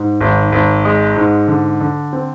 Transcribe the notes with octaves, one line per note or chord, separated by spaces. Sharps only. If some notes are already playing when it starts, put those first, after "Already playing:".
Already playing: G#2
G#1
G#1
G#3
G#2
D3
D3
C4